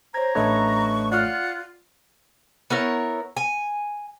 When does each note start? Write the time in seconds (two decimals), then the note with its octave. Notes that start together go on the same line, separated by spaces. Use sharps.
0.14 C5 C#5 A#5 G#6
0.35 A1 A3 D4 B4 C#5 D#5 C#6
1.12 F4 D5 F#5 F6 F#6
2.70 B3 E4 A#4 C#5
3.37 G#5